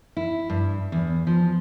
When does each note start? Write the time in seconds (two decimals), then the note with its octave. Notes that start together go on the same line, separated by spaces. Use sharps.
0.17 E4
0.50 G2
0.92 E2
1.27 F3